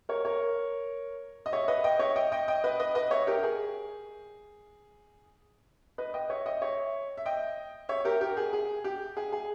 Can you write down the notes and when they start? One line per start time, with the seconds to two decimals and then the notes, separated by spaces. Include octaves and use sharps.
0.09 A#4 C#5
0.25 A#4 C#5
1.46 D#5
1.52 C#5 E5
1.68 B4 D#5
1.84 D#5 G5
1.99 C#5 E5
2.16 D#5 G5
2.32 D#5 G5
2.48 D#5 G5
2.64 B4 D#5
2.80 B4 D#5
2.95 B4 D#5
3.11 C#5 E5
3.27 G4 A#4
3.39 A#4
3.43 G#4
5.98 B4 D#5
6.14 D#5 G5
6.30 C#5 E5
6.46 D#5 G5
6.61 C#5 E5
7.17 E5
7.26 D#5 G5
7.89 C#5 E5
8.05 G4 A#4
8.21 G4 A#4
8.37 G#4
8.53 G#4
8.84 G4
9.17 G#4
9.32 G#4